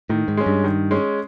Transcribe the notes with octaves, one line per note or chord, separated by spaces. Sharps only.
A2 D#3
G#2
G#3 C#4
G2
D#3
G#3 C#4